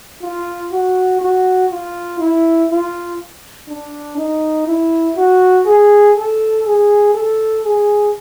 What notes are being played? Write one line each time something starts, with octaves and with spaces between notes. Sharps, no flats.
F4
F#4
F#4
F4
E4
F4
D4
D#4
E4
F#4
G#4
A4
G#4
A4
G#4